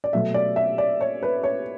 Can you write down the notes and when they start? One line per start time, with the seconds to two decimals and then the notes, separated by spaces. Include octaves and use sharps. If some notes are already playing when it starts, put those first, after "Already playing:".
0.04 D5
0.13 B2 F#3 A3 E5
0.34 D5
0.56 E5
0.78 D5
1.01 C#5
1.23 B4
1.44 C#5